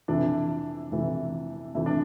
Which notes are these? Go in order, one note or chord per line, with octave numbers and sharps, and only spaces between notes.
F2 C3 E3 D4
F2 C3 E3
F2 C3 E3 E4
D4